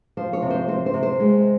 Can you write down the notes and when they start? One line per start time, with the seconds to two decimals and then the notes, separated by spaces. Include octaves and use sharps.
0.17 F3 C5
0.33 C#5
0.42 C3
0.50 C5
0.68 C4 C5
0.86 C5
0.94 C3
1.03 C5
1.20 G#3